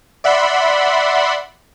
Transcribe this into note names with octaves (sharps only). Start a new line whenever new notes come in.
D5 E5 F#5 B5 C6